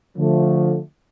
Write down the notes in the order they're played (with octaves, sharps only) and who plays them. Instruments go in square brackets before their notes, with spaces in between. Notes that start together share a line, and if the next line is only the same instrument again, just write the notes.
[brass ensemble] D3 F3 A3